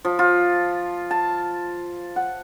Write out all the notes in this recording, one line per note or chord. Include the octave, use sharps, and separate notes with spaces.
F3
F4
A5
F#5